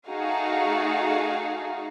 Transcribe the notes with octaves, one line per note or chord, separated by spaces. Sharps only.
A3 D#4 F#4 G#4 F5